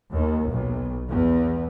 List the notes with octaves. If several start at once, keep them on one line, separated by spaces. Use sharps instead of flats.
D#2
B1
E2